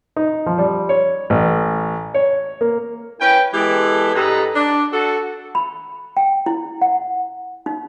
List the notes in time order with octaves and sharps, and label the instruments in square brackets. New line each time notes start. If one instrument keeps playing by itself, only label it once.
[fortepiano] D#4
F3
G3
C#5
A1
C#5
A#3
[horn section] C#4 E4 B4 G5
E3 G#3 B3 G4 A4
G2 G4 A4 B4 D#5 A#5
D4
F#4 A4
[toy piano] B5
G5
E4
F#5
D#4